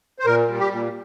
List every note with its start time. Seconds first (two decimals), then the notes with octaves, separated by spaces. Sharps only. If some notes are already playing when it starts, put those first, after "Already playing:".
0.19 C5
0.26 A#2 A#4
0.48 G3
0.59 G4
0.71 A#2